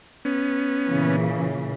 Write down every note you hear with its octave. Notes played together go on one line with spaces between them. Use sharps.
B3 C#4
A#2 C#3 E3